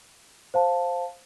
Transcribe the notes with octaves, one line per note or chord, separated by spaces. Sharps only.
C5 F5 A5